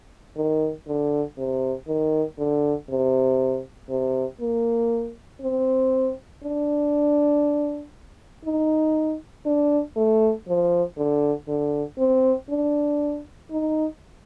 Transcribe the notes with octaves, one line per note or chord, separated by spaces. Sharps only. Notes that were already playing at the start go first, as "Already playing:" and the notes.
D#3
D3
C3
D#3
D3
C3
C3
A#3
C4
D4
D#4
D4
A3
F3
D3
D3
C4
D4
D#4